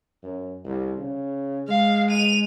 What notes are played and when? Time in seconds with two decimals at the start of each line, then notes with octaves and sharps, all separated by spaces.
0.23 F#2
0.65 C2
0.98 C#3
1.68 G#3 F5
2.10 D#7 F7